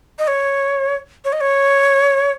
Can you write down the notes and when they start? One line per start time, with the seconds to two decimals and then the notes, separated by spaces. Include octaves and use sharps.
0.19 D#5
0.27 C#5
1.24 C#5
1.32 D#5
1.41 C#5